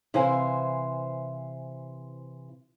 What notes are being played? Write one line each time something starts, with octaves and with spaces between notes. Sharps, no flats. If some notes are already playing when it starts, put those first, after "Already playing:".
C3 E3 E4 C5 F5 G#5